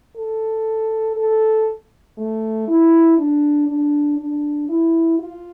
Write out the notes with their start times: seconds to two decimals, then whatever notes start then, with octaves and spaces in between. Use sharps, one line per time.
0.16 A4
1.16 A4
2.18 A3
2.68 E4
3.18 D4
3.68 D4
4.19 D4
4.69 E4
5.19 F4